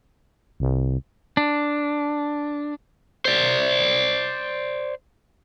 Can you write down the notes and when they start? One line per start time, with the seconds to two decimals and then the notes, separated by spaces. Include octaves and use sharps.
0.60 C2
1.37 D4
3.25 C5 D5